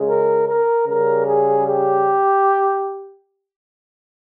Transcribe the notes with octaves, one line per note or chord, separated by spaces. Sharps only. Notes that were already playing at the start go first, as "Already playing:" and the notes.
Already playing: C#3 G#3
A#4
A#4
C#3 G3 A#4
G#4
G4